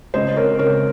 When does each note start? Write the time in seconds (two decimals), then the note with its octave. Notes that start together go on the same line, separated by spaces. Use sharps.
0.14 C#2 C5 D#5
0.36 C4 A#4 C#5
0.59 C#3 A#4 C#5